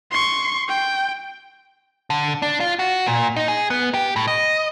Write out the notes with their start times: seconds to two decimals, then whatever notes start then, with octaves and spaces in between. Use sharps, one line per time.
0.11 C6 C#6
0.68 G5
2.10 D3
2.42 D4
2.60 F4
2.79 F#4
3.06 A#2
3.36 D#4
3.48 G#4
3.70 B3
3.94 G4
4.16 A2
4.27 D#5